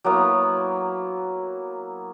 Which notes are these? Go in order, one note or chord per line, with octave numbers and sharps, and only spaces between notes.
F#3 A#3 B3 E4